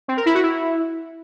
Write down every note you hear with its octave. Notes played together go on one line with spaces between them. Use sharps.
C4
A#4
E4
F#4
E4